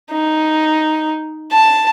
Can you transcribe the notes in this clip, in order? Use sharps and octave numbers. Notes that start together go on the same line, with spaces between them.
D#4
A5